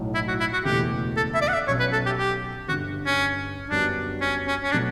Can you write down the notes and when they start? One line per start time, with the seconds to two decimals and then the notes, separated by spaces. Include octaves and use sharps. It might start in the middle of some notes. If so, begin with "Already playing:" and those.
Already playing: B1 A2 F#3
0.15 E4
0.28 F#4
0.40 E4
0.53 F#4
0.65 F#1 E2 B2 A3 G4
1.17 A4
1.34 E5
1.42 D5
1.48 F#5
1.54 E5
1.67 B1 B2 F#3 C#4 C#5
1.80 B4
1.92 A4
2.06 G4
2.18 G4
2.68 G1 G2 D3 F#4
3.06 C#4
3.70 F#2 D3 G3 B3 D4 F#4
4.21 C#4
4.48 C#4
4.63 C#4
4.72 B2 F#3 A3 D4